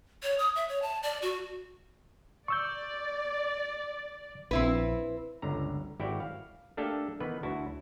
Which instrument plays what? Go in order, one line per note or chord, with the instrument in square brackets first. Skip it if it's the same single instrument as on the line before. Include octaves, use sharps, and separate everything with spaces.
[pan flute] C#5
D#6
E5
C#5
A5
D5
F#4
[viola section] D5 [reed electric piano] C#6 E6 G6
[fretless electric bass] A#1 [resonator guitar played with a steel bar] C4 E4 B4
[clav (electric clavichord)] G1 C#2 D3 A#5
G#1 E4 F#4 G4 D5 G5
F5
A3 A#3 D4 G4 A4
D#3 E3 B3 B4
D2 E4 F#4 A5